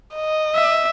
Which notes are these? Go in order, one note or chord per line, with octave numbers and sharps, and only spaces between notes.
D#5
E5